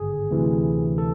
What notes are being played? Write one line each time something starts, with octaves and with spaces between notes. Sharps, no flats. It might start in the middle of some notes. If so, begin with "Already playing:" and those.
Already playing: G#1 G2 D3 G#4
D2 C3 E3
A4